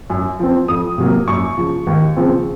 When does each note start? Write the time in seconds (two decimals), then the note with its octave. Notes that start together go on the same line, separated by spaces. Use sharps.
0.10 F#2
0.39 F3 C4
0.68 F2 D#6
0.98 C3 F#3 A#3
1.28 F#2 C#6
1.57 C#3 F3
1.87 D#2
2.17 C#3 F3 C4